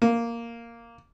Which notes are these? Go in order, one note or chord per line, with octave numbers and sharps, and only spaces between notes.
A#3